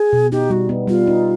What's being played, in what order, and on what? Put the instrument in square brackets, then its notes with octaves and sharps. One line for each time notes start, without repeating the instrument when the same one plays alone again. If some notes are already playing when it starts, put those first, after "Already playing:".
Already playing: [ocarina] G#4
[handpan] B2
[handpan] D#4 [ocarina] G4
[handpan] G3 [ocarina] F#4
[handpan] B3
[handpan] G3 [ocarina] F4
[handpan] D#4